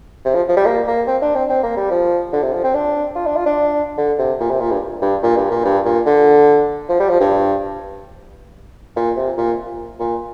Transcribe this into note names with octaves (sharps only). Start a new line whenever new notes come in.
C3
F3
F3
G3
A#3
A#3
C4
D4
C4
C4
A#3
G3
F3
D3
C3
F3
C4
D4
F4
D4
F4
D4
D3
C3
A#2
C3
A#2
G2
G2
A#2
G2
A#2
G2
A#2
D3
F3
G3
F3
G2
A#2
C3
A#2
A#2